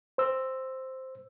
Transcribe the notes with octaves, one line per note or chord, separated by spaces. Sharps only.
C5 E6